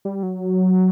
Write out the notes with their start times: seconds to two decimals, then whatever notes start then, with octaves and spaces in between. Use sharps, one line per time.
0.05 G3
0.23 F#3